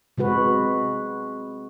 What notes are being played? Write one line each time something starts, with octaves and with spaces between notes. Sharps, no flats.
C3 G#3 F#4 B4